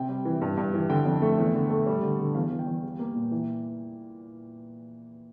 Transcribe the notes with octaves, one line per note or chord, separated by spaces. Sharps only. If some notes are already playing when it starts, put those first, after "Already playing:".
Already playing: C3 G5
G3
E3
G2
G2
E3
D3 G5
F2
A3
E2
D3
A3
G3
D3
D3
E2 F5
E2
G5
E2
G3
A#3
A#2
E3